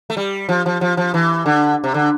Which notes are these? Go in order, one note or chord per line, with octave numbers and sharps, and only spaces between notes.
A3
G3
F3
F3
F3
F3
E3
D3
C3
D3